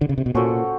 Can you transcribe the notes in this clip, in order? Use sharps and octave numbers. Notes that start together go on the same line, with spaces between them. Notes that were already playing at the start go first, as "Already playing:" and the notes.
D3
C#3
C3
B2
A#2 C#4 F#4 A4 C5